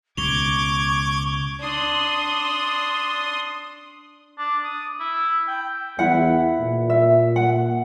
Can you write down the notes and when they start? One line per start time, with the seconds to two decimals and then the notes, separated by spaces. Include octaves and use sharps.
0.17 C#2 B2 C#6 D6 G#6 F7 G7
1.61 D4 C6 D#6
4.38 D4
4.64 D#6
5.00 E4
5.48 G5
5.99 E2 E4 F#5
6.60 A#2
6.90 E5
7.36 F#5